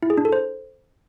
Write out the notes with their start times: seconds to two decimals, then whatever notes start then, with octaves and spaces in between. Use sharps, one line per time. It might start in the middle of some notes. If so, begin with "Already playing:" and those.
0.03 E4
0.10 G#4
0.18 D4
0.25 A4
0.33 C5